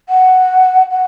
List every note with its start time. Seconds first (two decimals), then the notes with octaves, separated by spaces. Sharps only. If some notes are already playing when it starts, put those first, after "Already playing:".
0.09 F#5
0.91 F#5